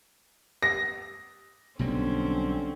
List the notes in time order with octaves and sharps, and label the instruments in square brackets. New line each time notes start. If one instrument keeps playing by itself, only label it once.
[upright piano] A#6
[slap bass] B1 B2 G3 [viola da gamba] D3 C4 C#4